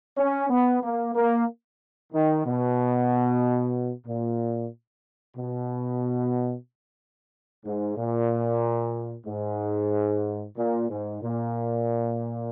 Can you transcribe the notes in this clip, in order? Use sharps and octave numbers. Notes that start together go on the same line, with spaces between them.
C#4
B3
A#3
A#3
D#3
B2
A#2
B2
G#2
A#2
G#2
A#2
G#2
A#2